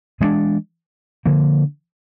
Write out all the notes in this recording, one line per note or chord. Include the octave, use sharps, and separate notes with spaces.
E3 G#3 B3 D4
D3 F3 A#3